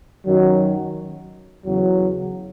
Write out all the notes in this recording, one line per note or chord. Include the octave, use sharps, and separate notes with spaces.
F#2 D#3 F#3
E2 C#3 F#3